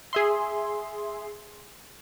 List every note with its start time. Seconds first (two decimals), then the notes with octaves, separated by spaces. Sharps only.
0.13 G#4 E5 C6